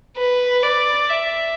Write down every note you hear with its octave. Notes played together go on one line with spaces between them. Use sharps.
B4
D5
E5